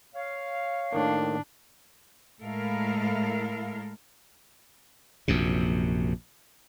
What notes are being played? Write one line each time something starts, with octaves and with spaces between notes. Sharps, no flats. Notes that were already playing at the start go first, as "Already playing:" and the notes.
C#5 F5
A2 D#3 A#3 D4
A2 G#3 E4 A4 A#4 F5
A#1 F#2 C3